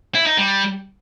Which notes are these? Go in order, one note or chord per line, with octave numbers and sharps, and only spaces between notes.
E4
D#4
G3